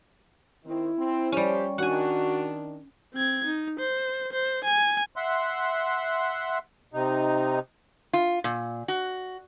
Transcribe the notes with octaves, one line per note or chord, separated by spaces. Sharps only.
D#3 C4 E4
C4
F3 G3 C#4 G4 C5
D#3 D4 F#4 F#5 G#5
C4 G#6
D#4
C5
C5
G#5
E5 F#5 C6
C3 D#4
F4
A#2
F#4